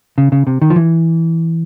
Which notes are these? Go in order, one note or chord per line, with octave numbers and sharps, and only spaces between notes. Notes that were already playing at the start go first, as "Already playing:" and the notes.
C#3
C#3
C3
D#3
F3
E3